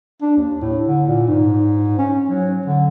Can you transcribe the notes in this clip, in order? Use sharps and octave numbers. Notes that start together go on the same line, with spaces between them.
D4
D#2
A2
D3
A#2
G#2
C#4
F#3
D3